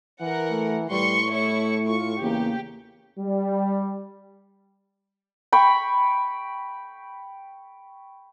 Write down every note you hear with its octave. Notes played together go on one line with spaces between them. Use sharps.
E3 A#4 F#5
A3
A2 G3 B4 C6 C#6
A3 E4 C#5 C#6
F4 C#6
E2 C#3 A#3 G4
G3
G5 B5 C#6